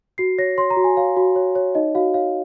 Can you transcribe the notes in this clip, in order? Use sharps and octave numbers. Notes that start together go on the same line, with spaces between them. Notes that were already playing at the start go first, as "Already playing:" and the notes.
F#4 C7
C#5 A#6
C#5 C6
A#5
F#4
G#5
C#5 F5
F#4
C#5
C#5
D#4 D#5
F#4 F5
C#5 F5